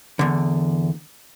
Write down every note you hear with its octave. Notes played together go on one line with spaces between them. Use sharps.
E2 D3